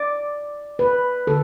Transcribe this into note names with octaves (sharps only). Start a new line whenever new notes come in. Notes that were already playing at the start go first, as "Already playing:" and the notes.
Already playing: D5
B4
D3 A4